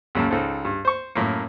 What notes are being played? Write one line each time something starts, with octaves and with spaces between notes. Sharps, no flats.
C#2 F#2 A#2 A5
C#2 D#4 A4 C5
G2
C5 C#6
F#2 A2 A#3